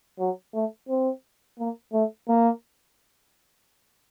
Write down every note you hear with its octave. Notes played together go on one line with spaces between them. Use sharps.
F#3
A3
C4
A#3
A3
A#3